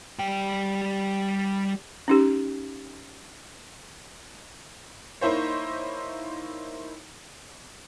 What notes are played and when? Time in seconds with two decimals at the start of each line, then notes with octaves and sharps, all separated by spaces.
0.19 G3 G5
2.08 C#4 D#4 G4
5.21 A#3 D#4 E4 C5 C#5